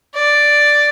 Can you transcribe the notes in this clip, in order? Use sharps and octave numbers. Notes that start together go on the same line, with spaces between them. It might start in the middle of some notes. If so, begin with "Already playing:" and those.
D5